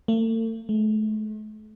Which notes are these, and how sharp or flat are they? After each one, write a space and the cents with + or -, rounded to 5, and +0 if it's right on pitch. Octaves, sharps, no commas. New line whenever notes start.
A3 +45
A3 -40